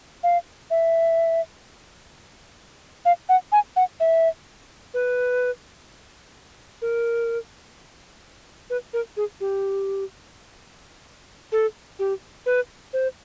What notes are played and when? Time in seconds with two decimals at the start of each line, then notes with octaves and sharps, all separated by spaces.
0.23 F5
0.71 E5
3.05 F5
3.29 F#5
3.52 G#5
3.76 F#5
4.00 E5
4.94 B4
6.82 A#4
8.70 B4
8.93 A#4
9.17 G#4
9.41 G4
11.52 A4
11.99 G4
12.46 B4
12.93 C5